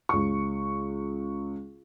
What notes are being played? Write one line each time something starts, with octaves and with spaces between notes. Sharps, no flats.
C#2 C#6